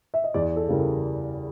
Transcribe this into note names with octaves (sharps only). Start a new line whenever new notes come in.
E5
D#5
E2 D5
A4
C#3 E3 G3 A#4
A4